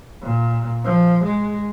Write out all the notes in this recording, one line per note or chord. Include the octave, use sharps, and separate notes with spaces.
A#2
F3
G#3